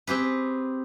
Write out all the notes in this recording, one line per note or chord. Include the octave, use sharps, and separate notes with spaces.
C4 G4 G#4 B4